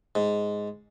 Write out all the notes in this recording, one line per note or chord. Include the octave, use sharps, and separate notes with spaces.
G#2